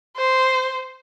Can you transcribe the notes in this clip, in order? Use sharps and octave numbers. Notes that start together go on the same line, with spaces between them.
C5